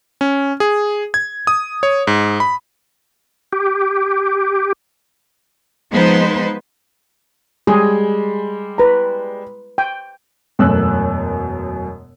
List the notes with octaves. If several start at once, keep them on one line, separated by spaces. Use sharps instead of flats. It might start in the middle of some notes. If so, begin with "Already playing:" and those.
C#4
G#4
G#6
D#6
C#5
G#2
B5
G4
F3 G#3 B3 D#4 B4 C5
G3 G#3 G#4
B4 A#5
G5
E1 F#2 B2 A3 E6 F#6